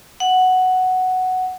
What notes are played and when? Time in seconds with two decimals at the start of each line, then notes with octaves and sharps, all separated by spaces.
0.20 F#5